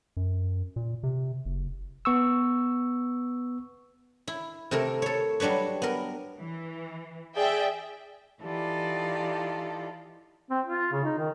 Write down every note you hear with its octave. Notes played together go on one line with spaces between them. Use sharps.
F#2
A#2
C3
F#1
B3 C#6 E6
E4
C3 A3 E4 A#4
A4 C#5
F#3 G3 D4 B4 C#5
B3 A#4
E3
G#4 D5 E5 G5
E3 D#4 F4 G4 A4 D5
C4
F4
C#3
D#4
D#3